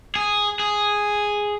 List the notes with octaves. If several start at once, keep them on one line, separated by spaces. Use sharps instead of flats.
G#4
G#4